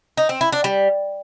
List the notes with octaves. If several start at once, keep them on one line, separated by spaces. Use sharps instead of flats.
D#4
C4
E4
D4
G3